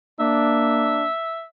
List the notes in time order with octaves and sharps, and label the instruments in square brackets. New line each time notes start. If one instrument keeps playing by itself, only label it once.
[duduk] A#3 [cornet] D4 [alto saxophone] E5